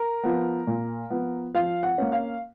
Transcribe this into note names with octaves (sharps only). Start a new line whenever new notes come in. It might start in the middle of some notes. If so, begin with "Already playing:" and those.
Already playing: A#4
F3 B3
A#2
F3 B3
F3 F5
F#5
A#3 C#4
F5